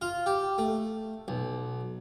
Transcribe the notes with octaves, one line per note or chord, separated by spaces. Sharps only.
F4
G4
A3
B1